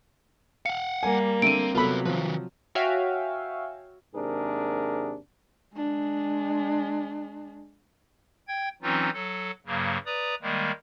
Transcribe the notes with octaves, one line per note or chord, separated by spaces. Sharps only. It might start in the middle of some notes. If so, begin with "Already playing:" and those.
F5 F#5 C#7
G3 A#3 G#5
D3 A3 C4 D7 D#7
C3 F#3 B3 F4 A4 B4 B5
D#3 F3 B4
F#4 C#5 E5 F5 G5 G#5
D#2 G#2 C3 D4 G#4 A#4
G#3 D4
G5 G#6
E3 F#3 C4 C#4 D#4 F4
F#3 A4
G2 C#3 F#3 A#3
B4 D5 A#5 D#6
D#3 G3 G#3 A#3